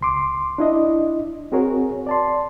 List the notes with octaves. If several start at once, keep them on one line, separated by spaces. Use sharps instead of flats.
C#2 C6 D6
D4 E4 D#5
C4 F#4 G#4 A#4 C#5
D5 A5 C6